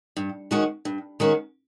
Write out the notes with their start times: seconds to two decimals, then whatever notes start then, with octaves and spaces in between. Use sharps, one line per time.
0.17 G2
0.51 D#3 G#3 C#4 F#4
0.85 G2
1.20 D#3 G#3 C#4 F#4